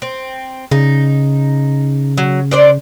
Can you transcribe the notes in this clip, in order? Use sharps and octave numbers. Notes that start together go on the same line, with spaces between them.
C4
C#3 D#4
F#3
D4 C5 D5